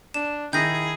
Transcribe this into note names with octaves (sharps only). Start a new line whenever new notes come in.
D4 E7
D#3 E4 G#4 G6 A#6